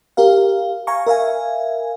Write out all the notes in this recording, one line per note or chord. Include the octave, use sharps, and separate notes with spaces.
G4 A#4 F5
F5 G#5 A#5 C#6
A#4 E5 F5 G#5